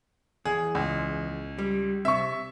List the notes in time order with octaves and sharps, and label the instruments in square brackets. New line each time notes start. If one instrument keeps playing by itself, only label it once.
[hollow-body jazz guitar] E2 [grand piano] G#4
[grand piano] C#2
[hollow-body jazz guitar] G3
[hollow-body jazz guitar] C3 [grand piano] E5 C#6